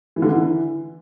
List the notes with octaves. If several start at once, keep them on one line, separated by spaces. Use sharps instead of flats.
E3
D3
D#3
E3